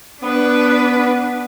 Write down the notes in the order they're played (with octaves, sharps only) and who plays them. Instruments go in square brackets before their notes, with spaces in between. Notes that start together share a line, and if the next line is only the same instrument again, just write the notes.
[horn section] B3 [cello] D4 B4